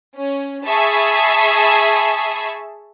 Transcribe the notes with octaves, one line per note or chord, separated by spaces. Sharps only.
C#4
G#4 E5 A5 B5 C#6 E6